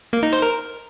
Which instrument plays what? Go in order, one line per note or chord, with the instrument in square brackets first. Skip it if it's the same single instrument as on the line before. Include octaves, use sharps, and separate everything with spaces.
[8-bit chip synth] A#3
D#4
C5
A#4